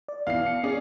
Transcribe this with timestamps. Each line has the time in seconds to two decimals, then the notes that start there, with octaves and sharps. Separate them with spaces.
0.08 D5
0.27 B2 E3 F5 C7
0.46 C#7
0.63 C#4 G#4 D5